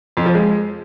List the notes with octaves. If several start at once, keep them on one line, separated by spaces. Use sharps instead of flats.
F2
F3
G#3